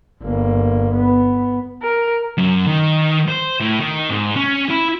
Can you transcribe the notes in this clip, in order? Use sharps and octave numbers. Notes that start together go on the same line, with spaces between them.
G1 A#3
B3
A#4
F#2
D#3
C5
A2
D#3
G#2
C#4
E4